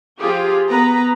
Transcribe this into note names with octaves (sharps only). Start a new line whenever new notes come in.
F3 F4 G4 G#4
B3 B4 A#5